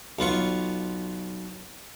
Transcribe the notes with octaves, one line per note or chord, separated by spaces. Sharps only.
B1 B3 F4 C#6